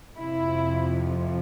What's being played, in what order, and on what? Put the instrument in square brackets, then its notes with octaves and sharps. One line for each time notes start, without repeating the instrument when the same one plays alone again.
[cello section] F2 C3 F3 E4